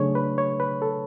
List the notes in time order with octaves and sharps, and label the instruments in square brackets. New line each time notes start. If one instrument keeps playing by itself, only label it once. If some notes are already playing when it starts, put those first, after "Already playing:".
Already playing: [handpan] C#3 F#3 A3 D4 G#4 [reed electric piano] C#5
[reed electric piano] B4
C#5
B4
A4